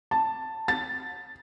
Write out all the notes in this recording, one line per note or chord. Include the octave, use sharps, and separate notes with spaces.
A5
A6